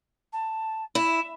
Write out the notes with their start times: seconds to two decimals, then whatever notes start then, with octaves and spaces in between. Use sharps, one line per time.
0.33 A5
0.95 E4 E5